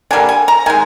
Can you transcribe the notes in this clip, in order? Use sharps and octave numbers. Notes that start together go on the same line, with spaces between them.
D3 G3 A#3 G#5
G#5
A#5
D#3 G#3 G#5